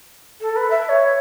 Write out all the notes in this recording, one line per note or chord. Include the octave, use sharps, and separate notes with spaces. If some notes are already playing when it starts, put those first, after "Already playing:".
A4
B4
E5
E5
C#5